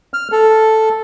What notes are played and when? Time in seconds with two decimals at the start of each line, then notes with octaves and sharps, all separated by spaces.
0.14 F6
0.32 A4